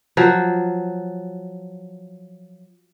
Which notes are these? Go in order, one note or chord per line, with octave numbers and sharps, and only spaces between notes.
F3 F#3